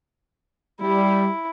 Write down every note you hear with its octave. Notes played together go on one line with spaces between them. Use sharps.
G3 E4